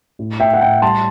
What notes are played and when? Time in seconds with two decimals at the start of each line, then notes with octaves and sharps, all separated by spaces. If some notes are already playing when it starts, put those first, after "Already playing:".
0.19 A2
0.40 A2 E5 G5
0.54 F#5
0.61 A2 E5 G5
0.82 G3 A5 C6